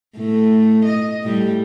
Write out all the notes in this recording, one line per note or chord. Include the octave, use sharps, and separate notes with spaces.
A2 A3
D#5
A2 G3